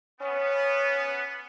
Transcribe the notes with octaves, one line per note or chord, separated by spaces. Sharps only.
B3 C#4